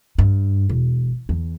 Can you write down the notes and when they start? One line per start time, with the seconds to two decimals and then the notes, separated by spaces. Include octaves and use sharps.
0.18 G2
0.69 E1
1.29 E2